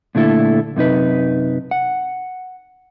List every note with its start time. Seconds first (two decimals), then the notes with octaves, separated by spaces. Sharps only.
0.15 A#2 D3 A3 E4 A4
0.76 F#2 C3 D#4 B4
1.71 F#5